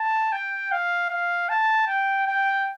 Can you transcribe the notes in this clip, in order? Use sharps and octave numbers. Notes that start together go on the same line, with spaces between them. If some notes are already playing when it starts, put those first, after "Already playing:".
Already playing: A5
G5
F5
F5
A5
G5
G5